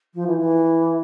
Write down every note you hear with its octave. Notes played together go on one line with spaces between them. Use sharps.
F3
E3
E3